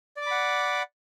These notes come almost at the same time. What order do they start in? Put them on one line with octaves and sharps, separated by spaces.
D5 D6 B5 F#5